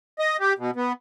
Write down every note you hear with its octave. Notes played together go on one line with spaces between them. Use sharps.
D#5
G4
B2
B3